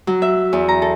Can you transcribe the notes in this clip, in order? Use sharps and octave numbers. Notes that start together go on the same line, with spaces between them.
F#3
E5
E2
A#5
A4